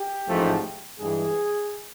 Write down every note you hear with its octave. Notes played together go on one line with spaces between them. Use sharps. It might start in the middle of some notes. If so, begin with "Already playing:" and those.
Already playing: G4
A1 G#2 F3 A3
G2 E3 G#3 G#4